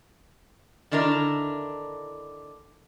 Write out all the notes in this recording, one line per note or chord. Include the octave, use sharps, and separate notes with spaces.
D3 D#3 D4 E4 A#4